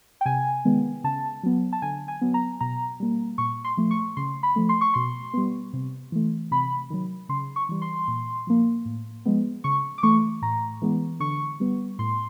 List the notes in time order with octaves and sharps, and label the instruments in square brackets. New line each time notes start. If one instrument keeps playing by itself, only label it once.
[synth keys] G5
C3 G#5
D#3 G#3 B3
C#3 A5
F#3 B3
A5
D3 G#5
G#5
F#3 B3
A#5
B2 A#5
G3 A#3
A#2 C#6
C6
F3 A3
C#6
C#3 C6
B5
F3 A3
C6
C#6
B2 C6
G3 B3
C3
E3 A3
C3 B5
D#3 F#3
C#3 C6
C#6
E3 G3
C6
A#2
F3 A#3
A2
F3 G#3 B3
C#3 C#6
D6
E3 A3 C#6
A2 A#5
E3 G#3 B3
D3 C#6
G3 B3
A2 C6